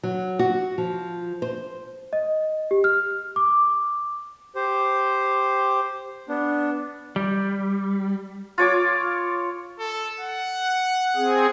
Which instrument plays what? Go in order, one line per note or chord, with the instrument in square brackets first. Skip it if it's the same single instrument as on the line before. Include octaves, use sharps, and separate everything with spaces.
[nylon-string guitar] F#3
F#4
F3
C5
[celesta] D#5
G4
F6
D6
[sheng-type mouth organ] G4 C5
B3 D4
[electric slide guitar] G3
[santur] F4 C#5 D6
[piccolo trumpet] A4
F#5
[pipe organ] C4 G#4